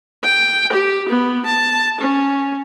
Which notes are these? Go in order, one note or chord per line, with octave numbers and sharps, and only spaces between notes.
G5
G4
B3
A5
C#4